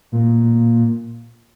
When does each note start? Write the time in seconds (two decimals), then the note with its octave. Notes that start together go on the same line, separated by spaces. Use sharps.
0.12 A#2